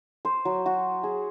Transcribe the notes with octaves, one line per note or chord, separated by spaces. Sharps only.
C5
F#3
F#4
G#4